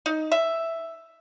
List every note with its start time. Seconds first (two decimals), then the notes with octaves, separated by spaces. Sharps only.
0.06 D#4
0.32 E5